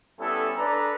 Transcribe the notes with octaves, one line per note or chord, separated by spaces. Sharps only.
G3 B3 C#4 E4 A4
D4 G#4 A4 B4 D5 A#5